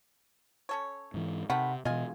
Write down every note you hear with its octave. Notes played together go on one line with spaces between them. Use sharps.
C#4 A4 C#5
G#2 E3
C3 D#3 A3 F#5 B5
B2 E3 F4 D#5 G#5